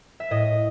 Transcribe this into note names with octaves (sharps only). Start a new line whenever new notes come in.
E5
A2 D#5